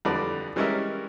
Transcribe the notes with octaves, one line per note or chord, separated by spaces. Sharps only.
F2 D3 E3 G3 B4 D5
E3 G3 G#3 C#4 A#4 E5